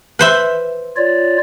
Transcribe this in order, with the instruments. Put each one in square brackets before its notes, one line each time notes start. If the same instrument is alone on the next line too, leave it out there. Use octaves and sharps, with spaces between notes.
[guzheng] B4 C5 E5
[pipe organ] F4 C#5 D5